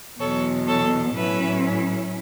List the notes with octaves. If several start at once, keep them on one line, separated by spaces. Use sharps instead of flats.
E2 B2 F#3 A4 C#5
A4 C#5
A2 F#3 C#4 E4 B4 E5